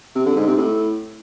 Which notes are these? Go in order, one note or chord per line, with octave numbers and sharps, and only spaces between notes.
C3
D3
G#2
C3
A2